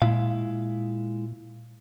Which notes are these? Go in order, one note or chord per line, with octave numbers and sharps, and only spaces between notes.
A#2 G#3 E4 F5